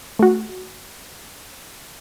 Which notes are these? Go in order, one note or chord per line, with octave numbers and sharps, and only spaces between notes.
A3 F#4